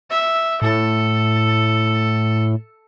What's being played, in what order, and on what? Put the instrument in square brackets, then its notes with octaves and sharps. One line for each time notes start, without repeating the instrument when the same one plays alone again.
[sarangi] E5
[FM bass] A2 [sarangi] A4